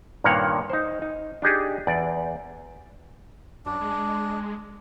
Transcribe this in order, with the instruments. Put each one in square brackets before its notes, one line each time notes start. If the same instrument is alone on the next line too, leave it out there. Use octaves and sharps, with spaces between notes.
[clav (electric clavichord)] G2 A#2 D#3 A#3 C#5 F#5
D#4 C5
D#4
D4 D#4 G4 G#4
E2 D5
[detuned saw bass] F#2 [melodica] D4
[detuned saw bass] G#3